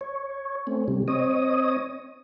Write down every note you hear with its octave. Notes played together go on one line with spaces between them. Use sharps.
C#5
A3 C4 C#4
C3 G3
C4 C#5 D#5 D#6